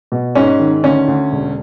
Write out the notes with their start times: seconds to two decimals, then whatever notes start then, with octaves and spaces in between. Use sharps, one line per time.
0.12 B2
0.35 G#2 C#4
0.60 D#3
0.84 D2 C#4
1.08 D2
1.32 E1